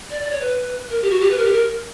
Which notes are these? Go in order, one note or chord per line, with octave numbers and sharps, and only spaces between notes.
D5
D5
C#5
B4
A#4
G4
F#4
G4
B4
A#4
G4
A#4